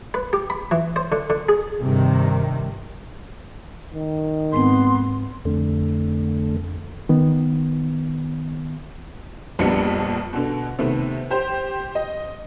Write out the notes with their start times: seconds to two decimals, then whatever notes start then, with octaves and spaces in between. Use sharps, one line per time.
0.14 B4
0.33 G4
0.50 B5
0.71 E3
0.96 C5
1.12 D3
1.30 D3
1.49 G#4
1.80 G2 C3 D#3
3.94 D#3
4.52 G#2 G#3 B3 C4 C6
5.45 F2 D3 A3
7.09 D#3 B3
9.59 A#1 F2 G3 B3 D4 C#7
10.33 B2 D3
10.79 C3 D#3 A3 B3
11.30 G4 C5
11.95 D#5